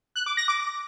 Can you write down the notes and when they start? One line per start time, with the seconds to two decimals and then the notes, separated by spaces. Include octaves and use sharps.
0.16 F#6
0.26 D6
0.37 A#6
0.48 D6